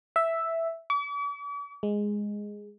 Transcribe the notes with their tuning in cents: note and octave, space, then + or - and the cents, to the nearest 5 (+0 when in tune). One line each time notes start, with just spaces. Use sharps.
E5 +0
D6 -45
G#3 -5